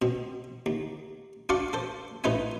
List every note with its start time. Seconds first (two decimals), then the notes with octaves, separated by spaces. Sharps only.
0.02 B2 C4
0.66 D#2
1.49 D4 F#4 D5 F5 C6 C#6
1.73 A4 C5
2.24 A1 D#4 B4 C5 E5 G#5